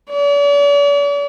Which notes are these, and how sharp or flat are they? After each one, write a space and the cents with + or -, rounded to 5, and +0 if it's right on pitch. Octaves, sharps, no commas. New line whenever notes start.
D5 -45